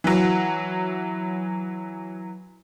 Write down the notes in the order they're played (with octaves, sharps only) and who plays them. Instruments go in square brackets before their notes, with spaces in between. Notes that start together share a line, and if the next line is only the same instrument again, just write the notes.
[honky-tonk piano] E3 F#3